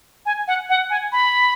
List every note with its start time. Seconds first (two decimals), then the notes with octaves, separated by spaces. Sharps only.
0.26 G#5
0.48 F#5
0.70 F#5
0.90 G#5
1.12 B5